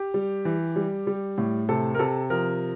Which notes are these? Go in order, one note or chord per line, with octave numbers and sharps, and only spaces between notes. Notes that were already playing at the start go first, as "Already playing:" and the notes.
Already playing: G4
G3
E3
G3
G3
A2
C3 A4
A#4
C3 A4
F3 A#4